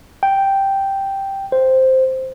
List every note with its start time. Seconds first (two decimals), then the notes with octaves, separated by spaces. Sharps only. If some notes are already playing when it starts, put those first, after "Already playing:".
0.23 G5
1.52 C5